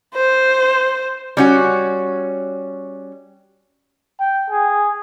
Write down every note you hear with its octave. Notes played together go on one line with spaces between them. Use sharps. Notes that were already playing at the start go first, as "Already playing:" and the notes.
C5
G3 C#4 F#4
G5
G#4